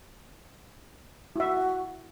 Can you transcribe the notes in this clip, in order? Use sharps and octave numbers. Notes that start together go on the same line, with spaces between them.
E4 F#4 E5